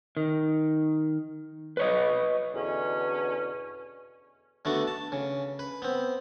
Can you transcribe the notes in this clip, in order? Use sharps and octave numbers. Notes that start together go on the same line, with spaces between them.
D#3
B4 C#5 D#5
E2 B2 D3 C#4
D3 A3 B3 D4 F#4
A5
C#3
B4
B3 C4